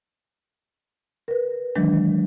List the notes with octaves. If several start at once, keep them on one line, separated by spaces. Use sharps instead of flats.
A#4 B4
D#3 E3 F#3 G#3 D4